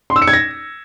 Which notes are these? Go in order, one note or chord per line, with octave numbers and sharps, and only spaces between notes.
C6
E6
C#7
G#6
A#6